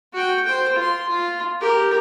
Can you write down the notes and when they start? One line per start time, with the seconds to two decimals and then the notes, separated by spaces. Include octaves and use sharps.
0.13 F#4 G5
0.45 C5 G5
0.76 F4 C6
1.09 F4
1.61 G4 A#4